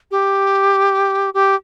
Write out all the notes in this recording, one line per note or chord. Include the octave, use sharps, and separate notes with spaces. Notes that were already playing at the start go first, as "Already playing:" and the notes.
G4
G4